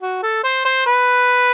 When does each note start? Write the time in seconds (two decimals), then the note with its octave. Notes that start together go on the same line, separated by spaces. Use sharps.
0.02 F#4
0.23 A4
0.44 C5
0.65 C5
0.86 B4